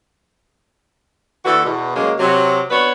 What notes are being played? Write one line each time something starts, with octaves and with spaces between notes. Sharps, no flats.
D3 E3 A3 F#4 A4
E2 B2
C#3 F#3 G#3 A#3
C3 F#3
B3 D4 F#4 B4 C#5